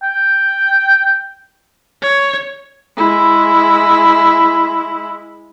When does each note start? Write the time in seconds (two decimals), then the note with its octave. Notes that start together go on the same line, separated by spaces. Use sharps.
0.03 G5
2.02 C#5
2.97 G#3 E4